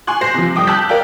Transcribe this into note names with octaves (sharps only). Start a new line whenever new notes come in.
G#5 C6 C#6 F#6
C5 A#6 C7
C3 F3
G1 G5 D6 D#6
A5 E6 F#6 G6 B6
A#4 D5 F5 G5